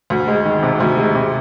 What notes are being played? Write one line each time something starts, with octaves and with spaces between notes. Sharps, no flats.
D2
G#3
D#3
C3
D2
G#3
C3